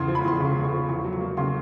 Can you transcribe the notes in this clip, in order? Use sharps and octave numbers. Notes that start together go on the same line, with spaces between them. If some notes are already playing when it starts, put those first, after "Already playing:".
Already playing: E2 C#3 C6
F3
B5
E2 C6
C#3 C#6
E2
C#6
F3
E2 C#6
F#3
C#6
A#3
C#3 C6